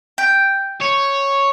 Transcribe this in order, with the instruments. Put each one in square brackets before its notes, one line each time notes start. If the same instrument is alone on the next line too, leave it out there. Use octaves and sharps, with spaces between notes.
[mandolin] G5
[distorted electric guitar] C#5